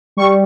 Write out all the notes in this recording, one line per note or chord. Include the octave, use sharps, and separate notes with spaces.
G3 C#6